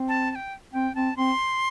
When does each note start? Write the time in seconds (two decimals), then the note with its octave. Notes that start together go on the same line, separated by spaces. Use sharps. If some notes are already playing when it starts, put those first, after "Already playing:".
Already playing: C4
0.08 A5
0.31 A5
0.35 G5
0.73 C4 G5
0.95 C4 A5
1.17 C4 C6